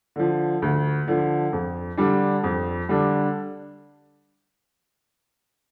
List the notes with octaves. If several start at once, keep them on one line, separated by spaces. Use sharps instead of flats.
D3 F3
D2
D3 F3
F2
D3 G3 D4
F2
D3 G3 D4